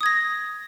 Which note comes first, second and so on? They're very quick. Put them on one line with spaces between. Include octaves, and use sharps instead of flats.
D#6 G#6 A#6